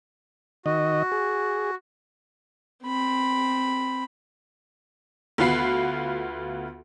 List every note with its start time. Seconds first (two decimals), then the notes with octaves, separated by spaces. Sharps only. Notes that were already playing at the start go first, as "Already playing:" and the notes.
0.66 D#3 F#4 D#5
1.12 G#4
2.84 C4 B5
5.38 D2 B3 F4 F#4 B5 C7